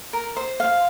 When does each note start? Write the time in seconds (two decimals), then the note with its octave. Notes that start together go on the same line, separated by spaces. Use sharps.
0.13 A#4
0.37 C5
0.60 F5